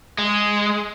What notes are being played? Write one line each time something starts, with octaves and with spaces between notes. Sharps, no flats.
G#3